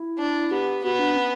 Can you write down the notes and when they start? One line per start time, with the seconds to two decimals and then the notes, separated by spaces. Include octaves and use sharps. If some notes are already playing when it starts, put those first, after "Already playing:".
Already playing: E4
0.18 D4
0.51 B3 G4
0.83 B3 F#4
0.99 D4
1.16 C#4